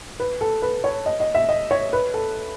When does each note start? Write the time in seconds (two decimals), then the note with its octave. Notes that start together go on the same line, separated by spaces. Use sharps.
0.20 B4
0.41 A4
0.62 B4
0.84 C#5
1.06 D#5
1.20 D#5
1.35 E5
1.49 D#5
1.71 C#5
1.93 B4
2.14 A4